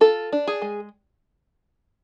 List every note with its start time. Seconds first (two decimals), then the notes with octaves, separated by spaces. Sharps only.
0.01 F4 A4
0.32 D4
0.48 G#4
0.62 G#3